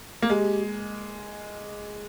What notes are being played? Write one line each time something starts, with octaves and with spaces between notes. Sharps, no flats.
A#3
G#3 G4